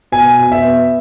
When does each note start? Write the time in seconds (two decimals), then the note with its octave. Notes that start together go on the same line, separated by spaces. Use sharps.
0.12 B2 G#5
0.39 B2
0.52 E5
0.65 B3